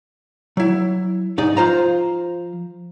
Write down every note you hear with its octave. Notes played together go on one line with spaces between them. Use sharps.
F#3 E4
C2 G#2 D#4 D5
F3 F4 C5 A#5